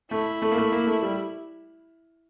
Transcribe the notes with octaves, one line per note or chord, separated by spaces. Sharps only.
A3 E4
A3
A#3
A3
A#3
A3
G3